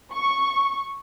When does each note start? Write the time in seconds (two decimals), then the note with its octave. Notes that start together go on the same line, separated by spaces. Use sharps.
0.12 C#6